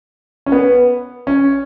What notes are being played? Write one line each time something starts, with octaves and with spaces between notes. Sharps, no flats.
C#4
B3
C#4